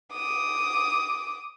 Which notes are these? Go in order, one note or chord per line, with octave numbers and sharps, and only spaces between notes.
D6 D#6